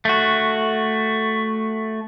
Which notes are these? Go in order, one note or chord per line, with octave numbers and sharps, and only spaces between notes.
A3 F#4